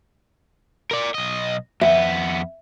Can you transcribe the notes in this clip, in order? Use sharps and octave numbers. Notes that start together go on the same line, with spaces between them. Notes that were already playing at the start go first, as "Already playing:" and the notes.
A#4 D5
B1 D#5
F2 B3 E5